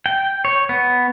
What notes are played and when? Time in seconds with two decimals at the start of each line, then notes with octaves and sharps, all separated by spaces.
0.06 G5
0.45 C#5
0.69 B3